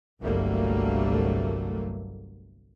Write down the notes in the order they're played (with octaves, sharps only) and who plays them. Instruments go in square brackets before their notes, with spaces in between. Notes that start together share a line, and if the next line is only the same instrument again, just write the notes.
[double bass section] G1 C2 F#3 G3 A3 A#3